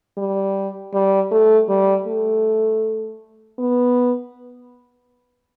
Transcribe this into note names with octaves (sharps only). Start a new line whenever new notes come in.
G3
G3
A3
G3
A3
B3